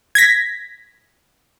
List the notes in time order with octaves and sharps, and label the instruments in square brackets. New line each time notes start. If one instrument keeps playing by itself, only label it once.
[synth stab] G#6 A#6 B6